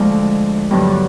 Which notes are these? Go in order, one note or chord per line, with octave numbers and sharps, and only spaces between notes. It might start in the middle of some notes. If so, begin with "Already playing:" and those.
Already playing: D2 D3 F3 G#3
G2 D3 F#3 B3 E4